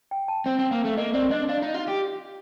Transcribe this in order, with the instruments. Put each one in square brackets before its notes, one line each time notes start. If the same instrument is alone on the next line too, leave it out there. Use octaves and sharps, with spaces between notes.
[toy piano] G5
A5
[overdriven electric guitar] C4 [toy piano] G5
[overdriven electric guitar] C4
[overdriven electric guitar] A#3 [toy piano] F5
[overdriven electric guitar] A3
[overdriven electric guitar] A#3 [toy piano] D#5
[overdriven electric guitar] C4 [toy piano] D5
[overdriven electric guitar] D4 [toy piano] D#5
[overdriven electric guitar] D4 [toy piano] F5
[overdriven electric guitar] D#4
F4
G4